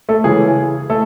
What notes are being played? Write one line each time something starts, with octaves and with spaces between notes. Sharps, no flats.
A3 A4
C#3 E3 G#3 G#4
A3 A4